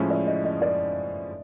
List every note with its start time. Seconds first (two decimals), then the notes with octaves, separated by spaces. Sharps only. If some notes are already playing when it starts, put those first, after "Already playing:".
Already playing: A2 F3 G#3 C#4 E4
0.10 D5 E5
0.27 D#5
0.44 D#5
0.62 D5